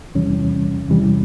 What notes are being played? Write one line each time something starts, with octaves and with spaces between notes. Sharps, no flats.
E2 C3 E3 G3 C#4
E2 C3 E3 G3